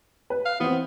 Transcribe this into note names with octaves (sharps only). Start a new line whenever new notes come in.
B4
F5
E3 B3 C4